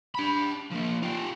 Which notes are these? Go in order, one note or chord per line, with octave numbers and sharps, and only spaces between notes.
D4 B5
F3 A#3
F4 G4